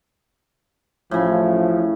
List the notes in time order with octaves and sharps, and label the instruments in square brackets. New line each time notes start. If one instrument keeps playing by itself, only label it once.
[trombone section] A1 F3 [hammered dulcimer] A2 C#3